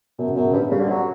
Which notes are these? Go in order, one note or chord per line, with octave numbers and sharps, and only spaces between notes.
F#2 B2
C#3
F#2 B2
C#3
G2 D3
C#3 G3
D3
F#3